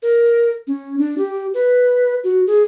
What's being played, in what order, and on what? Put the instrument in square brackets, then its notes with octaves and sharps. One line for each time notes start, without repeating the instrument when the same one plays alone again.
[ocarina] A#4
C#4
D4
G4
B4
F#4
G#4